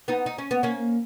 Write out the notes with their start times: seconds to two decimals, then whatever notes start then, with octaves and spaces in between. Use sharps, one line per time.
0.08 B3 D#4
0.26 D#4
0.38 C#4
0.51 B3
0.63 A#3 C#4